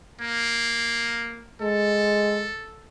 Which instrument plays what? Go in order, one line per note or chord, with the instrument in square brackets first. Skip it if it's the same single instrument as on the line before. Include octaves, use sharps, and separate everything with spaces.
[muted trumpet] A#3
[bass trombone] G#3 [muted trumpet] A4